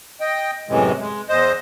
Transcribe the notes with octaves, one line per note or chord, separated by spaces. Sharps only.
D#5 G5
F#2 A2 C3 E3 G#3
G#3
E2 C5 D#5